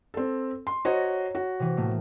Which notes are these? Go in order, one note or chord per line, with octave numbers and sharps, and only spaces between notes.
C4 A4
C6
F#4 C5 C#5 D#5 A#5 G#6
F#4
C3 E3
A2 A3 A#3